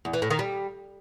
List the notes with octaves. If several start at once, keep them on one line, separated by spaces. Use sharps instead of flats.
E2
E3
A2
D#3
G3